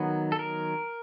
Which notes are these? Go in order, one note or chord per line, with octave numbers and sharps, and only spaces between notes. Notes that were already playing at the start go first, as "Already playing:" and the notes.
Already playing: D#3 F#3 B3
A4
A#4